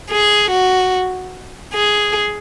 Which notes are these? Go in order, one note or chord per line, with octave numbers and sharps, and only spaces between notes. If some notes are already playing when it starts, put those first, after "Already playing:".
G#4
F#4
G#4